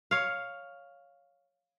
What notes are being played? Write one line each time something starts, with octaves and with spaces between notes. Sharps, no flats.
C#5 F5